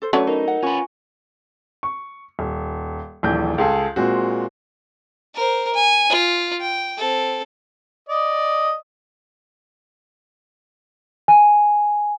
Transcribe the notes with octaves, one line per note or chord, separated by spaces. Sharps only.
A4 C5
F#3 A3 C#4 D4 B4 C#5
D#4 A#4
F#5
C#4 F4 B4 G#5 C#6
C#6
D#1
D#1 A#1 E3 G6
C#2 G#4 A4
A#2 G#3 C4 F#4
A#4 C5
G#5
F4
G5
C4 A4
D5 D#5
G#5